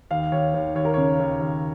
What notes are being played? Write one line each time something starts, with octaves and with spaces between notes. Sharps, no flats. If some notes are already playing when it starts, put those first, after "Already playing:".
D#2 F5
D#2 C#5
D#2
D#2 C#5
A#4
C#3 C#5
D#2
D#2